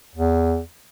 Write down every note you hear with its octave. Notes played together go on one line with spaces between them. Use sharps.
E2